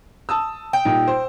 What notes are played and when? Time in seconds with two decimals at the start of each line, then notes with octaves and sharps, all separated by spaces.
0.29 A5 D#6 E6
0.73 G5
0.85 A#2 G3 D#4
1.08 C5